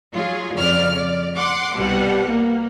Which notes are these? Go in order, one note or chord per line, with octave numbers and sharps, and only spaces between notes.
F#3 F4 G#4
F2 C#3 D5 F6
D5
F#5 C6 D6
C2 B2 G3 F#5
A#3